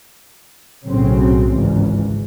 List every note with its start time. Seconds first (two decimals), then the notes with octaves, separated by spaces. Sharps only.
0.87 B1 A2 C#3 F#3 C4
1.53 G#1 C#2 G2 E3